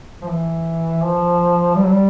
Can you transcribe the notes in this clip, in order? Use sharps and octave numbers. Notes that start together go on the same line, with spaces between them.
F3
E3
F3
G3
F#3
G3